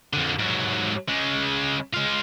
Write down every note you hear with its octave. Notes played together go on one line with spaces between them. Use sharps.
F2 D3
G#2 F#3
C#3 G#3
G#3 F4